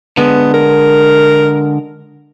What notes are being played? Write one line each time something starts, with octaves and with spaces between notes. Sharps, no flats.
D3 G#3 B3
A#4